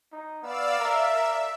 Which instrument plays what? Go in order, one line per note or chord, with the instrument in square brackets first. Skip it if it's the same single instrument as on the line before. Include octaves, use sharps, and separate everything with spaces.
[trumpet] D#4
[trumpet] B3 [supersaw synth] D5 F5 E6
[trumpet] A#4 [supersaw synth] E5
[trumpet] A#4